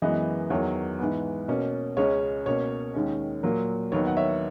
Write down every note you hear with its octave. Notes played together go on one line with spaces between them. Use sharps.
F#2 E3 G#3 B3 D#5
E2 D#3 F#3 C#5
G#2 E3 B3
B2 A#3 C#4
C#2 C#3 G#3 C#4 C#5
B2 A#3 C#4 C#5
D#2 D#3 G#3 C#4
A#2 F#3 A#3
D#2 D#3 F#3 B3 C#5
F#5
C#5 E5